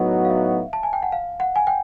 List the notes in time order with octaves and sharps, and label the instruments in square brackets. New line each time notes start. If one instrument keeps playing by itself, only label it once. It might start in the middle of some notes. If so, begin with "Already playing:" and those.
Already playing: [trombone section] A2 F#3 B3 D#4 F#4
[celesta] F5
E5
A5
G#5
G5
F#5
F5
F#5
G#5
G5